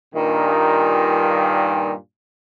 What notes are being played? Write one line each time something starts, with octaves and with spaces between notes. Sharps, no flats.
G2 A#2 D#3